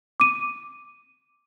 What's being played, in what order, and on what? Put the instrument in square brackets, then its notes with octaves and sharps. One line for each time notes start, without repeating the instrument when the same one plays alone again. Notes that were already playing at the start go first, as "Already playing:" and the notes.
[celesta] D6 D#7